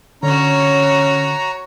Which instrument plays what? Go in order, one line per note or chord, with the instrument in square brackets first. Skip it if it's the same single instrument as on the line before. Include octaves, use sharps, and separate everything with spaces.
[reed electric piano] D3 [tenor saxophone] C#4 [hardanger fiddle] F#4 C#5 [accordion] A#5